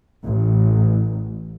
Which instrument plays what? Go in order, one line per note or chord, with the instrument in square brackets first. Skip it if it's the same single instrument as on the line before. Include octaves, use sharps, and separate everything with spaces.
[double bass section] A1